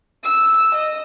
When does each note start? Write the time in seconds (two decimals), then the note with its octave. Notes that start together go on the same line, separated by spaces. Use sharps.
0.24 E6
0.74 D#5